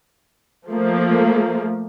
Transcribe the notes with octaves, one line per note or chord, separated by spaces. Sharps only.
F3 A3 A#3